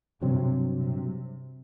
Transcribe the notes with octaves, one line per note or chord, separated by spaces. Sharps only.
G2 C3 F#3 C4
C3